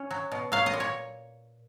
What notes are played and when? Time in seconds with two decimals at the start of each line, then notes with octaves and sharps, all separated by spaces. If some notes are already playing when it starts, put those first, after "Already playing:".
Already playing: C#4
0.11 F#3
0.32 B2
0.52 F#3 F5
0.66 D#5
0.74 A#2
0.80 C#5